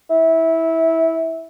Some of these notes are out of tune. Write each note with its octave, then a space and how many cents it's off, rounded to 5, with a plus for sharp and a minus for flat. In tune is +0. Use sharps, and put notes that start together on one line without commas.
E4 -15